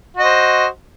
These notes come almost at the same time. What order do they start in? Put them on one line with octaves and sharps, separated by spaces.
F#4 D#5 C5